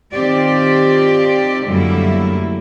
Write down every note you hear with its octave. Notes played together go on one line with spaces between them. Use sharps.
D#3 C4 F4 G4 D5
F#2 D3 G3 A3 A#3 E4